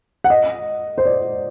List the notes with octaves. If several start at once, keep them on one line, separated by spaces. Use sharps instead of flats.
F#5
D#5
C5
D5